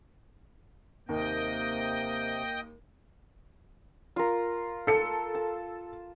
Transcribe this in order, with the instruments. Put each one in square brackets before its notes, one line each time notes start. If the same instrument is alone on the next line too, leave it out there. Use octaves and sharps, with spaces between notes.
[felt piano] D#2 A#4 [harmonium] C3 [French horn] A#3 [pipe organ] D#5 G5
[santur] F4 A#4
[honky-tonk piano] A4 C#7
[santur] A5